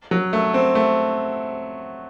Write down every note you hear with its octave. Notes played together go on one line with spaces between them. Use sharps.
F#3
A3
C4
A3